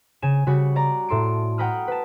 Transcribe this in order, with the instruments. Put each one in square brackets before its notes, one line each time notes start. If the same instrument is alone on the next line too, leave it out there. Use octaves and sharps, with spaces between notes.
[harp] C#3 G#5 E7
C#3 G3 F#4 B5
D5 A#5
A2 A4 C6 D7
F#5 G5 A#5 B5 D#6 F6
B4 A5